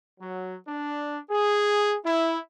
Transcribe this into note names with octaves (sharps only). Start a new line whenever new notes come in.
F#3
D4
G#4
E4